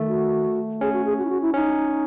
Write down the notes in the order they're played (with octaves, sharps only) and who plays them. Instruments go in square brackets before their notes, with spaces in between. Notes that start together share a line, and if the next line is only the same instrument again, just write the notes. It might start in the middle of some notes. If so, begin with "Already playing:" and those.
Already playing: [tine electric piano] D#3 A3
[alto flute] F#4
[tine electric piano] C#4 [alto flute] G#4
[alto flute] F#4
G#4
F#4
E4
F#4
E4
[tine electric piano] C#4 [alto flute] D#4